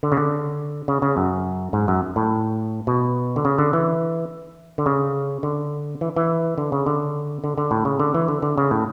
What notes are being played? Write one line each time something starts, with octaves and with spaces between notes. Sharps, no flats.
D3
C#3
D3
C#3
C#3
F#2
G#2
F#2
A2
B2
D3
C#3
D3
E3
D3
C#3
D3
E3
E3
D3
C#3
D3
D3
D3
A2
C#3
D3
E3
D3
D3
C#3
A2